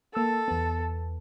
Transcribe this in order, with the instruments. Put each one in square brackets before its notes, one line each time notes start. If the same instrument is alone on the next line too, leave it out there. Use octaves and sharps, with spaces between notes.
[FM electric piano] A#3 E6 [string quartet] A4
[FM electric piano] E2 B3